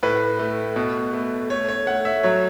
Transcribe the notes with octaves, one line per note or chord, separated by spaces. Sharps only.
A2 B4
A3
B2
A3
A3 C#5
C#5
A3 F#5
E5
F#3 C#5